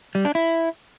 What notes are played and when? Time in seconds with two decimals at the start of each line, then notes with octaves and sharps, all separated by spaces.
0.15 G3
0.25 D4
0.35 E4